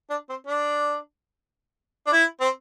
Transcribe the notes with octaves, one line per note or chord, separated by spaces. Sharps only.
D4
C4
D4
D4
E4
C4